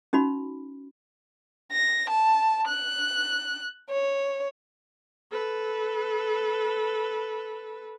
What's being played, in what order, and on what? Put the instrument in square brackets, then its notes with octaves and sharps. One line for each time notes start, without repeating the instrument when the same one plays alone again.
[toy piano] C#4 D#4 F#4 B5
[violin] A#6
A5
F#6
C#5
[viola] A4 B4